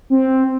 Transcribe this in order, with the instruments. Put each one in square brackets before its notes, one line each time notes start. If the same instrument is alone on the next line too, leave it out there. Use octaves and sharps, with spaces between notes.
[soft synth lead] C4